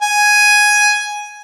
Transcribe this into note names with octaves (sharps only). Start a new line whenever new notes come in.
G#5